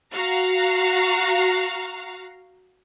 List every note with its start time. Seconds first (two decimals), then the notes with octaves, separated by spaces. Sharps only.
0.13 F#4 F5 A#5